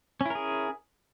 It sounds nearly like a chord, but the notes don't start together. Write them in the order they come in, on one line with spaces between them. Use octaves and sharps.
C#4 E4 A#4 G#4